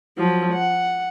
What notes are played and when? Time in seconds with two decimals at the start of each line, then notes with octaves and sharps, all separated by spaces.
0.17 F3 F#3
0.53 F#5